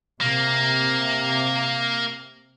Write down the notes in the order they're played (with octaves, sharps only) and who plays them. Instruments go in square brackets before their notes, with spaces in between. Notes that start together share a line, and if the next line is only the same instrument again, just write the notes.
[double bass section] C3 [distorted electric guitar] A#3